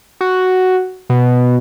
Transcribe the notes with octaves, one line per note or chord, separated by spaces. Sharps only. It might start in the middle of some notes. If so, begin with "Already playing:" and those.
F#4
B2